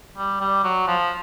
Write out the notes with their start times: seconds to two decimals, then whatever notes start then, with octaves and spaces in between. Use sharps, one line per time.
0.17 G3
0.41 G3
0.64 F#3
0.87 F3